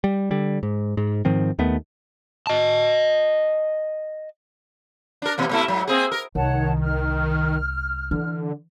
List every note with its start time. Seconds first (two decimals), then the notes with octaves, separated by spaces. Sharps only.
0.04 G3
0.31 D3 G3
0.63 G#2
0.97 G#2
1.25 G#2 D#3 F3 C4
1.59 D#2 D#3 A3 B3
2.47 D#5 A5
5.22 D4 A#4
5.38 B2 E3 A#3
5.49 B2 A3 E4
5.68 G#2 F#3
5.88 A#3 C4 G#4
6.12 A#4
6.35 C2 D#3 C#5 F#5 A5
6.81 F6
8.11 D3 E3